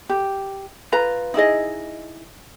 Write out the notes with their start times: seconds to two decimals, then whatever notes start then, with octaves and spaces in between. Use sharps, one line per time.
0.09 G4
0.92 F4 B4 A#5
1.34 D#4 E4 G#4 D#5